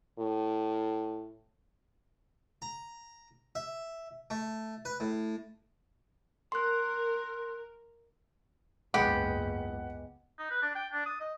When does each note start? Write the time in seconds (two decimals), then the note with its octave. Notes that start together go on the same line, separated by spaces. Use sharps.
0.19 A2
2.62 A#5
3.55 E5
4.30 A3
4.85 B4
5.00 A2
6.52 A#4 C6 F#6
8.94 F#1 C#2 G#2 G#3 B3 G4 F#5
10.39 D#4
10.50 B4
10.62 D4
10.75 G5
10.92 D4
11.06 D#6
11.20 D#5